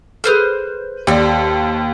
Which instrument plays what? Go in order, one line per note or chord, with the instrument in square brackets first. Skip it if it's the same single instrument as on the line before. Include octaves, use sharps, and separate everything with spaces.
[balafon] G#4 A4 [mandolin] B4 C5 F6
[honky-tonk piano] D#2 [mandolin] C4 A4 [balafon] G4 D5